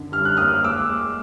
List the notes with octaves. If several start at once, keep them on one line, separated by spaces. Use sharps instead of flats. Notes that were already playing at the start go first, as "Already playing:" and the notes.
Already playing: F#2 D3
G3 F6
F#6
A#3 D#6 F6
G#3 D6 E6
G#3